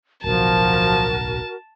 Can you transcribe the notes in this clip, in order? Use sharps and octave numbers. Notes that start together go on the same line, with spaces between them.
D1 B1 F3 F#4 A#4 A5